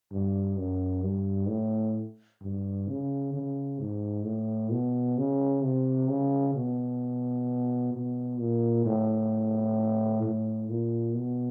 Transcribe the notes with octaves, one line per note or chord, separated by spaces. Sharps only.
G2
F#2
G2
A2
G2
C#3
C#3
G#2
A2
B2
C#3
C3
C#3
B2
B2
A#2
A2
A2
A#2
B2